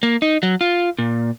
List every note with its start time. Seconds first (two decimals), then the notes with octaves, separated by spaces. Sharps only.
0.03 A#3
0.22 D#4
0.43 F#3
0.61 F4
0.99 A#2